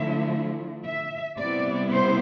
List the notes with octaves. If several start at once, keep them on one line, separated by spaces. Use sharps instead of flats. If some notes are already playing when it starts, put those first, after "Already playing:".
Already playing: D3 F3 A3 E4 E5
E5
C3 G3 B3 E4 D5
C5